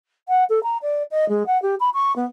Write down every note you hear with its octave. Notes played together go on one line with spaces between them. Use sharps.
F#5
A4
A#5
D5
D#5
G#3
F#5
G4
B5
C#6
B3